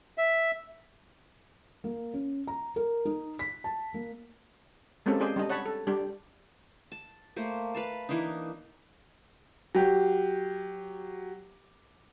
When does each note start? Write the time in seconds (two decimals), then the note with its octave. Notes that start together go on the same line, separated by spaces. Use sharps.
0.18 E5
1.84 A#3
2.14 C#4
2.47 A#5
2.76 A#4
3.05 D#4
3.39 B6
3.64 A5
3.94 A#3
5.06 G#3 A#3 C4 C#4 G4 A4
5.20 G4 G#4 C5 D5 D#5
5.36 G3 D4 D#5
5.49 C#5 F#5 A5 B5
5.66 A4
5.87 G3 D4 G4
6.92 A5
7.36 A3 A#3 C5
7.75 B4 F5 A5
8.09 E3 A#3 D4 D#4
9.75 F#3 G4